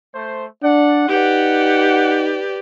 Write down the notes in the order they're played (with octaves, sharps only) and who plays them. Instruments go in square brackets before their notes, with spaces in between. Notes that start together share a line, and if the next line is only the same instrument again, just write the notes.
[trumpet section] A3 C5
[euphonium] D4 [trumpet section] D5 F#5
[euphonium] D#4 [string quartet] G4 B4 D5 [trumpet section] F#5